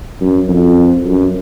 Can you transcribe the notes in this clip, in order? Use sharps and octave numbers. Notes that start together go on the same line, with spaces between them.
F#2
F2
F#2